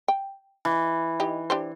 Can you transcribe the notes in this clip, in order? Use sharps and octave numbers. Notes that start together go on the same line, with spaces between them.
G5
E3
D#4 G4 D#5
D4 G4 C5